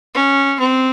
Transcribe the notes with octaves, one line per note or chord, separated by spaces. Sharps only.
C#4
C4